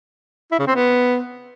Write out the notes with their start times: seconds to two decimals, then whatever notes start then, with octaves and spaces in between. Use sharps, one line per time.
0.52 E4
0.60 C#3
0.67 C4
0.75 B3